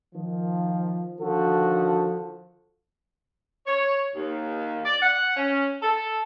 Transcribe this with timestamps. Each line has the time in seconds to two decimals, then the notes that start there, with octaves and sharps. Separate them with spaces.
0.15 D#3 F3
1.21 D3 D#3 F3 F#4 A4
3.67 C#5
4.16 D#2
4.85 D5
5.02 F#5
5.37 C#4
5.83 A4